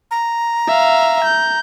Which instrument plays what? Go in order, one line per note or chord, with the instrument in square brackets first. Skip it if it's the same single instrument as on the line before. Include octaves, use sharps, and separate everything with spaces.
[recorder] A#5
[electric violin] E5 F5
G6